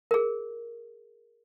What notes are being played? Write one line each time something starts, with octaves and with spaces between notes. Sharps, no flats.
G#4 A#4